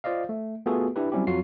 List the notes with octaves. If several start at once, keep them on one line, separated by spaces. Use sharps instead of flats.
F4 C5 D5 D#5 F5
A3
A3 B3 F4 F#4 G#4 A4
D4 E4 G4 B4
F#3 G3 C4 C#4 E4 G4
F2 F#3 F4 F#4 C7